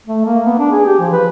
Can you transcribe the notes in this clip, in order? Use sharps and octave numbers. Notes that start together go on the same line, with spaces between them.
A3
A#3
B3
D4
G#4
G4
F3
B4